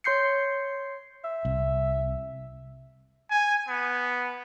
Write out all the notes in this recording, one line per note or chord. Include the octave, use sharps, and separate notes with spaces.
C#5 C6 G6 C7 C#7
E5
C2
G#5
B3